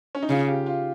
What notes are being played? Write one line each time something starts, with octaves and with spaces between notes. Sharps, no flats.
C#4
D#4
C#3 F4
G4
F4